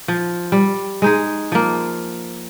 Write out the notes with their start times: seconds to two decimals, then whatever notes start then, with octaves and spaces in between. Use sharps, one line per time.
0.08 F3
0.52 G3
1.02 G#3 D#4 G#4
1.52 F3 A#3